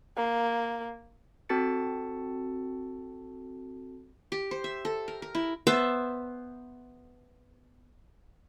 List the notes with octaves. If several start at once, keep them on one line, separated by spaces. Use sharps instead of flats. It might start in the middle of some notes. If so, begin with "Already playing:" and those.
A#3
C4 F#4 A4 A5 A6 C#7
G4
C5
E5
A4
A#4
A#4
E4
B3 C5 E5 A5